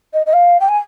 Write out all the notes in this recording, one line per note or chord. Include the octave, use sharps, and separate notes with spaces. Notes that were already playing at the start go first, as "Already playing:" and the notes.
D#5
D#5
F5
G5
G#5